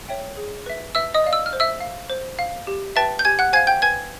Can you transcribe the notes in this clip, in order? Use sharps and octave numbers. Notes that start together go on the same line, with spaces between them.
C#5 E5 G5
G#4
B4 E5
B4 E5 E6
D#5 D#6
D5 F5
E6
F6
C5
E5 E6
F5
C5
F5
G4
B4 E5 G5 A5 A6
G6
G4 G#5 G#6
F#5 F#6
C5 F5 G#5 G#6
G5 G6
B4 G#5 G#6